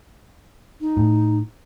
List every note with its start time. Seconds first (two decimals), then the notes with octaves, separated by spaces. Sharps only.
0.81 D#4
0.97 A2